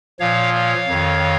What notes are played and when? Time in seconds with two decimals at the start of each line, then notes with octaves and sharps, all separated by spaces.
0.20 A#2 F3 C#5 F5
0.53 C#5 F5
0.88 F2 D#3